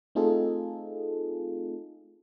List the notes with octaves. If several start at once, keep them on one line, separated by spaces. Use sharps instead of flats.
A3 C4 D#4 F4 G#4 A4